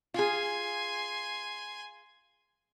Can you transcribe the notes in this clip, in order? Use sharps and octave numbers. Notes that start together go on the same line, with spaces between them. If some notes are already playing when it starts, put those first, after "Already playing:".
F4 G#4 G#5 C6